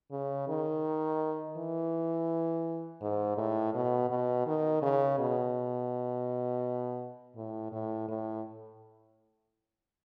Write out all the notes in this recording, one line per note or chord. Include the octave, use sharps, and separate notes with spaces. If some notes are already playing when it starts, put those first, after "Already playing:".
C#3
D#3
E3
G#2
A2
B2
B2
D#3
C#3
B2
A2
A2
A2